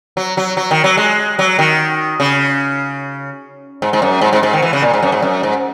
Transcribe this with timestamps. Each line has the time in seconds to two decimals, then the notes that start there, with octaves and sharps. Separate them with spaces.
0.17 F#3
0.37 F#3
0.57 F#3
0.71 D#3
0.84 F#3
0.97 G#3
1.39 F#3
1.59 D#3
2.20 C#3
3.82 G#2
3.93 G#2
4.02 F#2
4.21 G#2
4.33 G#2
4.43 G#2
4.53 D#3
4.62 E3
4.73 C#3
4.82 A#2
4.94 G#2
5.02 F#2
5.12 G#2
5.22 F#2
5.43 G#2